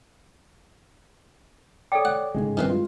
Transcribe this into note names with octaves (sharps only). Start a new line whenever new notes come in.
A4 C#5 D5 G5 D6
F#5
G1 G#2 C#3 G#3
G2 D#3 E3 C4
G#3 F4